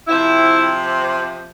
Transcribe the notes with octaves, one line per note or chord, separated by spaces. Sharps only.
C3 F3 C4 E4